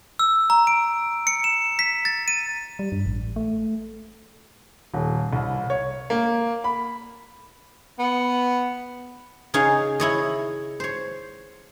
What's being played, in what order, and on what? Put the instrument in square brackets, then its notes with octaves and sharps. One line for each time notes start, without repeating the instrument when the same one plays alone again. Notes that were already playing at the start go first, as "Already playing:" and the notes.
[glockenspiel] E6
A#5
D7
C#7
E7
B6
A6
D#7
[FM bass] G3
G2
A1
A3
[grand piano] D#1
C2
C#5
A#3
B5
[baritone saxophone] B3
[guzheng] C#3 D#4 G#4 C#5 F5
E4 C#5 D#5
C5 C#5